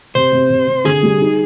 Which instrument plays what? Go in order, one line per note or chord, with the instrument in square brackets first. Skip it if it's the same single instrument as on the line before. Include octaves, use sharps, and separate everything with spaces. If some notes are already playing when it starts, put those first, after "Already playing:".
[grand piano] C3 [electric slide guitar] C5
[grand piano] C3
C3
C3
[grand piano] D3 [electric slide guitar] G#4
[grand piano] G3
D#4